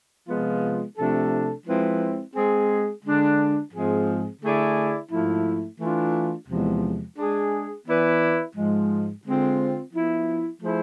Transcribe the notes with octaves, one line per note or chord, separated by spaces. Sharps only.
C3 F3 G#3 B3 F4
C3 F3 A3 D4 A4
F3 G#3 C4 E4 B4
G#3 C4 G#4
D3 G#3 D4
G#2 F3 G#3 C4 G#4
D3 A3 E4 G#4 D5
G#2 F3 A3 E4
E3 A3 D4 F4
E2 C3 F3 G#3
G#3 D4 G#4
E3 B3 E4 B4 D5
G#2 F3 G#3
D3 G#3 C4 F4
F3 B3 E4
F3 A3 E4 G#4 C5